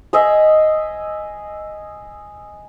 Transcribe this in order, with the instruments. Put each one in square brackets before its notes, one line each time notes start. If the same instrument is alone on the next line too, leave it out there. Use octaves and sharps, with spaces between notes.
[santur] G#4 D#5 E5